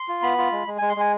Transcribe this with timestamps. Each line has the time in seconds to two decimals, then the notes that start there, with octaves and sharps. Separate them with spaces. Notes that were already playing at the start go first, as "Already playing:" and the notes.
Already playing: C6
0.08 F4
0.22 B3 B5
0.38 F4
0.52 G#3
0.67 G#3
0.78 G#3 G#5
0.89 C6
0.96 G#3 G#5